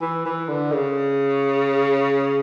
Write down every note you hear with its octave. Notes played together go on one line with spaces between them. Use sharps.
E3
E3
D3
C#3